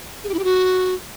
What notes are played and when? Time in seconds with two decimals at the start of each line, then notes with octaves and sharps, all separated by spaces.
0.24 G#4
0.29 G4
0.34 E4
0.39 G4
0.44 F#4